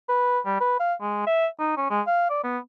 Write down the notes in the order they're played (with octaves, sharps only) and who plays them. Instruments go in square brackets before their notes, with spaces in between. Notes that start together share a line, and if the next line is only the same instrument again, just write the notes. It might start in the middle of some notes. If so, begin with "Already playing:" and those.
[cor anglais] B4
G3
B4
F5
G#3
E5
D#4
C#4
G#3
F5
D5
B3